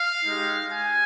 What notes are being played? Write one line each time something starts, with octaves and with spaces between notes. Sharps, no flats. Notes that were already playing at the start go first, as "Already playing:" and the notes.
Already playing: F5
G#3 D#4 G4
G#5